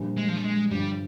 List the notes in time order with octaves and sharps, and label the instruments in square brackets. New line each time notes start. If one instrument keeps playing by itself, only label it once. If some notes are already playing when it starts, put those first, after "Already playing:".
Already playing: [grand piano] A#1 A#2 G3 D4
[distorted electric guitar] G#3
F3
G3
G#3
[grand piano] G2 D3 F3 [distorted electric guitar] G3